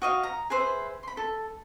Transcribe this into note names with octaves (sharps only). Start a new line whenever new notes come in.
F#4 D#5 F5
A#5
G#4 B4 C5 E5
B5 C6
A4